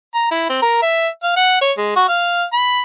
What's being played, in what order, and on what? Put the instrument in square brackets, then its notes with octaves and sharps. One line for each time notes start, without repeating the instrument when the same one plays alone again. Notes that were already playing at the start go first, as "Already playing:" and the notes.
[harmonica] A#5
E4
C4
A#4
E5
F5
F#5
C#5
G#3
F#4
F5
B5